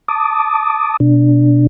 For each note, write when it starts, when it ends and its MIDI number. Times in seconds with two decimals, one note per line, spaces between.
0.08 0.97 81
0.08 0.97 86
0.08 0.97 87
1.00 1.67 47
1.00 1.67 62